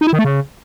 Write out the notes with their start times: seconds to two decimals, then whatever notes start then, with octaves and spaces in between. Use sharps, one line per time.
0.01 D#4
0.07 E4
0.13 D#3
0.19 A3
0.24 C#3